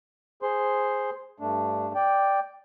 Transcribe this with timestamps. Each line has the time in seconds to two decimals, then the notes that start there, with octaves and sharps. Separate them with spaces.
0.42 G#4 C5 C6
1.40 G2 A3 D4
1.95 D5 G5